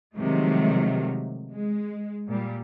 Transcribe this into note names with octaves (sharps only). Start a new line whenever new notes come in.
C3 D#3 F3 F#3 G#3 A3
G#3
A#2 G3